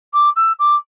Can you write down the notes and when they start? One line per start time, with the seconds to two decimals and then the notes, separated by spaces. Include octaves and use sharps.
0.14 D6
0.36 E6
0.59 D6